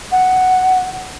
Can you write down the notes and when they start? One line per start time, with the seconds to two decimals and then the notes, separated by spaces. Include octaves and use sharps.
0.11 F#5